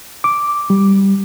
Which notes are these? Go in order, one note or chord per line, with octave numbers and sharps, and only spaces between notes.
D6
G3